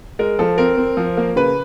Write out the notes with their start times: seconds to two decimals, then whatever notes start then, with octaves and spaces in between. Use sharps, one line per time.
0.19 G#3 A#4
0.39 F3 A4
0.58 C4 A#4
0.77 C4
0.97 F3
1.17 A#3
1.36 C#3 B4